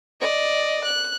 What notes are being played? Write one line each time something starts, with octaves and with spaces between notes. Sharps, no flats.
D5 D#5
F#6